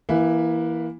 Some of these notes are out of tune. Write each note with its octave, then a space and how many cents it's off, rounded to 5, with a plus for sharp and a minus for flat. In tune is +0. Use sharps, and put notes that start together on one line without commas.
E3 +0 A#3 +20 E4 +0